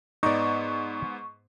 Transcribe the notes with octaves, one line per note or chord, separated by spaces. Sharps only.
G#2 B3 D#4 D5 C#6